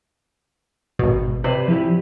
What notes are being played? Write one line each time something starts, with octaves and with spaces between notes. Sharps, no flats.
G#1 B2
C3 B4 C5 D5
F3 E4 G4